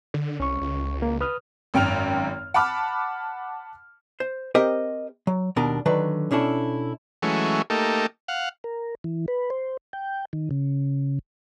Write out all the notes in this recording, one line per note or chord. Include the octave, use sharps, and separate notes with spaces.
D3
C2 C#4 C#6
C#2
A#3
B4 D#6 F6
G#1 F#2 G5 F6 F7
F#5 A5 B5 D6 F6
C5
C4 G4 A#4 C5 D#5
F#3
D#2 B2 D4 A#4 A#5
D3 D#3 F#3 D4 B4
B2 C#4 D4 E4 A4
E3 F#3 G#3 A3 C#4
A3 A#3 D#4 G4 A4
F5 F#5
A#4
E3
B4
C5
G5
D#3
C#3